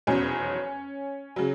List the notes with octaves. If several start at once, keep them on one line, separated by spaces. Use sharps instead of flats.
F1 E2 B2 F#3 C#4
C#3 F#3